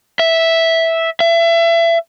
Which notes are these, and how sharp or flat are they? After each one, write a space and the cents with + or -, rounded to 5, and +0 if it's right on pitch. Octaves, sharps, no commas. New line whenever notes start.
E5 -5
E5 +30